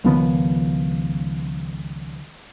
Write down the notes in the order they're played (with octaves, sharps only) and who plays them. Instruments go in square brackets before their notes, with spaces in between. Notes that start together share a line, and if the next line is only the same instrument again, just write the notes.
[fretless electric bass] C#2 D#3 F3 B3